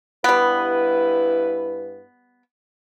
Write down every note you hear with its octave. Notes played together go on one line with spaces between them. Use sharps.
G2 G3 B3 E4 B4